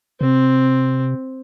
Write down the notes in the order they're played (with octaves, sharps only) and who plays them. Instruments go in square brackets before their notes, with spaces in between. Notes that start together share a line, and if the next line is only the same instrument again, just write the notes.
[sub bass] C3 [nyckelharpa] C4